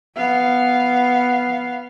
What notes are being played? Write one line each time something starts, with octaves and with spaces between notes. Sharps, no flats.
B3 F5